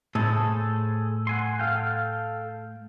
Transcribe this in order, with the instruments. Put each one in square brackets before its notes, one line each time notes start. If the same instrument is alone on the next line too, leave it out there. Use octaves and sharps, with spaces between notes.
[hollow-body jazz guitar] A2 [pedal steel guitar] G#4 A4 C5
[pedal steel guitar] F#5 G#5 C6
A4 F5 G5